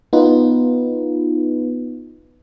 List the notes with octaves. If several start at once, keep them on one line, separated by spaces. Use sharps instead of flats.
B3 D#4 F4 B4